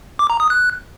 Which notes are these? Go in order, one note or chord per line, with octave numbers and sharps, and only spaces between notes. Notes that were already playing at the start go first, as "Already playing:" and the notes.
D6
A#5
D#6
F#6